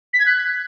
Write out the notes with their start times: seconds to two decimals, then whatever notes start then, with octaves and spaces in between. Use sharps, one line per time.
0.14 B6
0.20 G#6
0.26 F#6